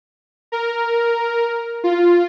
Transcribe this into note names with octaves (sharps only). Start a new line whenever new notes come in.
A#4
F4